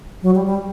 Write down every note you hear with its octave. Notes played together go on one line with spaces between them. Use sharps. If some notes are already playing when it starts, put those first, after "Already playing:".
F#3
G3
G3